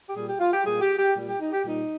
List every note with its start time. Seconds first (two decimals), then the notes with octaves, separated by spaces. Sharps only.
0.09 G4
0.14 A#2 G3 G#4
0.27 G4
0.39 F4
0.52 G4
0.64 A#2 G3 G#4
0.81 G4
0.98 G4
1.15 A#2 G3
1.27 G4
1.40 D#4
1.52 G4
1.64 A#2 G3 D#4